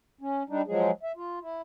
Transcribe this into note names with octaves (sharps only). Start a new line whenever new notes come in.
C#4
G3 D4 D#4
F3 F#3 G#3 G#4
E5
F4
E4